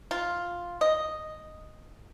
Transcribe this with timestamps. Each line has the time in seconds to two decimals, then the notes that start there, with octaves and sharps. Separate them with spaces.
0.11 F4
0.81 D#5